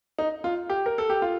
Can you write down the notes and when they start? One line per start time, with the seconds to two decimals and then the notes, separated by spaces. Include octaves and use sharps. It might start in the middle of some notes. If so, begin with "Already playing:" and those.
0.19 D#4
0.44 F4
0.70 G4
0.86 A#4
0.98 A4
1.10 G4
1.22 F4